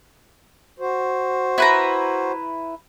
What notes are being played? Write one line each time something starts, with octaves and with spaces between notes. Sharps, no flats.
F#4 C5
E4 B4 A#5